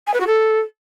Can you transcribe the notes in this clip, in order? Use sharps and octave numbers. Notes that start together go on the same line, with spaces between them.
G#5
B4
F#4
A4